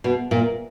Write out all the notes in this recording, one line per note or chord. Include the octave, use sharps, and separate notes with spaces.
B2
A#2